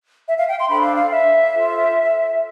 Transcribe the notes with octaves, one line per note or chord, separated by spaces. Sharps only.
E5
F5
G5
C6
D4 A4 C5 B5
F5
F5
E5
F4 A4 C5